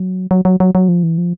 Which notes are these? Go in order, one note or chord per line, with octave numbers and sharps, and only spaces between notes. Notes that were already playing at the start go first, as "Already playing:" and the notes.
Already playing: F#3
F#3
F#3
F#3
F#3
F3
E3
F3